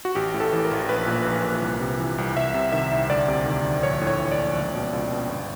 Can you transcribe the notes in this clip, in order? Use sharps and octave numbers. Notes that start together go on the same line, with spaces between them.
F#4
A1 G4
A2
A4
E3
A#4
A1
A#1 B4
A#2
A#1
A#2
C2
C3
E3
C2
C2 E5
C3
D#3 E5
C2
D2 D5
C3
D#3
D2
A#1 C#5
A2
C#5
E3
D5
A#1
C#2
B2
C#2
B2
G1